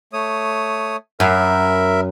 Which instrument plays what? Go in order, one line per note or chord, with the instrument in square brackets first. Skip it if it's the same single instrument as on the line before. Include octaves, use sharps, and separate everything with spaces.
[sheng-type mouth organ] A3 C#5 D#6
[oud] F#2 [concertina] A#4 E5 [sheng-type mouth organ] B5